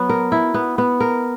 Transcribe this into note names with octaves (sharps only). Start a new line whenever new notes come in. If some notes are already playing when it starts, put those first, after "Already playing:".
Already playing: F#3 B3 F#4
A#4
E4
B3
B3
A#4